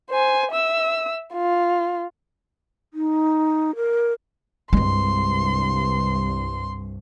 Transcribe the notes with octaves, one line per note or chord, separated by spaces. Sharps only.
C5 G#5
E5 E6
F4
D#4
A#4
C2 G2 G#3 C4 C6